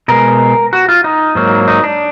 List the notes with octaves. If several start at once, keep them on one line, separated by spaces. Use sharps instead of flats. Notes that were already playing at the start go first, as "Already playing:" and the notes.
B2 G#3 A#4
F#4
F4
D#4
G#2 F#3 A#3
D#4
D4